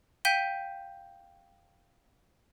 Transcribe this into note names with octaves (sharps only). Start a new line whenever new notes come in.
F5 G5 G6 B6 D#7 G7